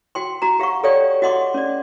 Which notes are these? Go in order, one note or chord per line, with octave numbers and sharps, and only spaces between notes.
F#4 G5 C6
F#4 A#5
G4 F5 F#5 C#6
G4 A4 C#5 D5 F5 G5
F#4 D#5 F#5 C6 D6
C#4 D5